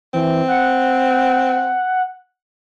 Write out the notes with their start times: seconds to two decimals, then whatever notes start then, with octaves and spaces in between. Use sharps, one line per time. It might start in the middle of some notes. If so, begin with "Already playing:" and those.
0.14 E3 C4
0.48 F#5